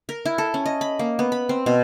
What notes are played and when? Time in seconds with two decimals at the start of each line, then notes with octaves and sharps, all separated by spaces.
0.09 A#4
0.25 E4
0.38 A4
0.54 C#4
0.66 D#5
0.81 B5
0.99 A#3
1.19 B3
1.32 B5
1.49 C4
1.66 B2